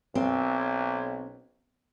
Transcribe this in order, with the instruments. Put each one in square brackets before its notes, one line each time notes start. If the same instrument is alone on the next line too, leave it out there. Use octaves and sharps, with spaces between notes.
[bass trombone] B1 [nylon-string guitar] C4